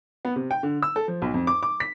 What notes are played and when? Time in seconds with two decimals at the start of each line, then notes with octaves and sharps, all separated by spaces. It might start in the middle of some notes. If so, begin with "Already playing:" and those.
0.25 B3
0.36 C3
0.51 G5
0.63 D3
0.82 E6
0.96 A4
1.08 F3
1.22 B1
1.34 F2
1.47 D6
1.63 D6
1.80 B6